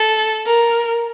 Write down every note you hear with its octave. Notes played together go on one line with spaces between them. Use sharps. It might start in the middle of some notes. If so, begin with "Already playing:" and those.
Already playing: A4
A#4